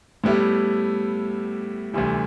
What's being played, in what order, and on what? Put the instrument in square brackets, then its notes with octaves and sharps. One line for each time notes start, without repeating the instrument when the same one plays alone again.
[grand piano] A2 G3 B3 E4 G4
D2 C3 E3 G3